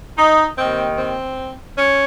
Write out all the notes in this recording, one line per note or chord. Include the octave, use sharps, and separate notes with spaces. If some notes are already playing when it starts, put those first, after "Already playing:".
D#4
D#2 D#3 C4
C4
C#4